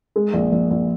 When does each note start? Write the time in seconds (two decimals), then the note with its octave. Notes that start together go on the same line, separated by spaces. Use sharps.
0.16 G#3
0.34 A#1
0.52 A#1
0.71 A#1